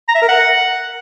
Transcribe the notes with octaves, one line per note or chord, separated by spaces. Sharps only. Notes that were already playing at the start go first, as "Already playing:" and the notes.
A#5
E5
A#4
F#5